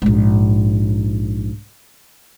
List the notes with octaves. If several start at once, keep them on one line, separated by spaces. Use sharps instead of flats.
A#1 G#2